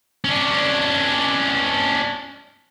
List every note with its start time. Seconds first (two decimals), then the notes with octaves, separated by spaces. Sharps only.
0.24 C#4 D4